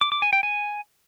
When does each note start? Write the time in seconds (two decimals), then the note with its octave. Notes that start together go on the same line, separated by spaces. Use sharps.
0.01 D6
0.12 D6
0.22 G#5
0.33 G5
0.43 G#5